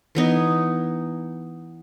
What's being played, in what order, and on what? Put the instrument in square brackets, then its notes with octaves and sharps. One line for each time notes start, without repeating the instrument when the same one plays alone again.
[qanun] E3 B3 D#4